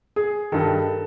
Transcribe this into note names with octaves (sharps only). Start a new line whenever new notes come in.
G#4
G2 D#3 A4